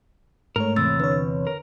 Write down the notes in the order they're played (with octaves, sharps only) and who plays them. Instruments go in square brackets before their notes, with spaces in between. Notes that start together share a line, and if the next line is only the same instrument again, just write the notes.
[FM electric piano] G#2 A3 C#5 [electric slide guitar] A#4
[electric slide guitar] E2 C3 [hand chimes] E6 A6
[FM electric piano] D3 C#5 [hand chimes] B4
[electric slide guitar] A#4